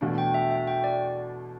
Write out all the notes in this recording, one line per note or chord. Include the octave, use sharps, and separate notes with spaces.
E2 B2 A3 D4
G5
E5
E5
G5
D5